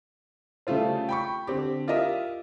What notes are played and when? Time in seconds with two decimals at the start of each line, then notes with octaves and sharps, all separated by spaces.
0.67 C#3 G3 A3 F4 C5
1.09 G5 B5 C#6
1.47 D3 C4 G4
1.88 F4 G4 A#4 D#5 E5